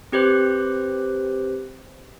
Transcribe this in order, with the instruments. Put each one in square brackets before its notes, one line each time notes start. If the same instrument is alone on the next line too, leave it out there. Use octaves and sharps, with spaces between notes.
[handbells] C4 G4 B4 C5